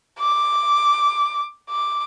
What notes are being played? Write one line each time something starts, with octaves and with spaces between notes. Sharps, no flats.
D6
D6